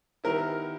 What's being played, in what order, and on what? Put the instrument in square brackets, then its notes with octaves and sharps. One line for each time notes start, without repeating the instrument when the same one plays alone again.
[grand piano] D#3 G3 B3 E4 [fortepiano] A#4